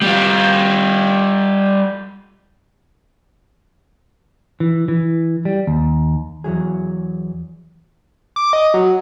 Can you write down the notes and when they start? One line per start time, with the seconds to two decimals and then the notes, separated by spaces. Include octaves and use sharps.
0.02 G3 F4
4.60 E3
4.88 E3
5.45 G3
5.67 D#2
6.44 E2 E3 F#3 G#4
8.36 D6
8.53 D#5
8.74 F#3